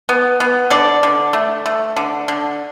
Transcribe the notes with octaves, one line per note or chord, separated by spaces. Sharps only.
B3
B3
D3 A4 D5
D3
A3
A3
D3
D3